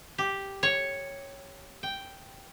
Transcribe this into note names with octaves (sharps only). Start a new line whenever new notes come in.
G4
C#5
G5